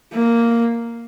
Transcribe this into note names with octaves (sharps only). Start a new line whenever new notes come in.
A#3